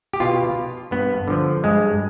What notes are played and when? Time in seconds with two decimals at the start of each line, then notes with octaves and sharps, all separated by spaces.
0.13 G4
0.20 B2 F4
0.91 G2 B3
1.28 D3 F3
1.64 G2 G#3